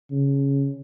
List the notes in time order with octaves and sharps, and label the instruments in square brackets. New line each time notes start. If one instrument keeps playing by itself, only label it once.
[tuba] C#3